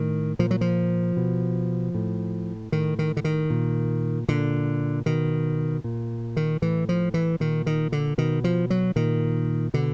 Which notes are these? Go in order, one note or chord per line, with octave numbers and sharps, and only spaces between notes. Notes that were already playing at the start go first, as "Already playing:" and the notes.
Already playing: A2 D#3
A#2 F3
F#3
F3
B2
A2
A2 D#3
D#3
D3
D#3
A#2
A#2 D3
B2 D#3
A#2
D#3
A2 E3
F3
E3
A#2 D#3
D#3
D3
B2 D#3
F3
F#3
A#2 D#3
B2 D3